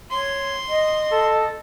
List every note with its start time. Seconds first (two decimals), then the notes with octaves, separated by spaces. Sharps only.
0.11 C#5 C6
0.68 D#5
1.12 A4